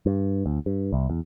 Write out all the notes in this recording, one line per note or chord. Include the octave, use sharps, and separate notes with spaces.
G2
D2
G2
C2
E2